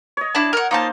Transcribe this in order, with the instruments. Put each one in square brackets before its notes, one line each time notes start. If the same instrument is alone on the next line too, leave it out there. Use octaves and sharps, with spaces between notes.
[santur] C#5 D#5
[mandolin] D4 E4 A5
A#4 F#5
[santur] A#3 C5 [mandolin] D#4 F4 A5